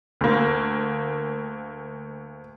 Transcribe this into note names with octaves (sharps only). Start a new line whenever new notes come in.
D2 A#3